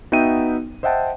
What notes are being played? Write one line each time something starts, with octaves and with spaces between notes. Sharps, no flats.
B3 D#4 F#4 E5 G5 D#7
C5 D#5 E5 F#5 G5 A5